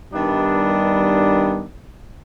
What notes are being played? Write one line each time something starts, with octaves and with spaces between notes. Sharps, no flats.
G2 D#3 G3 B3 D4 D#4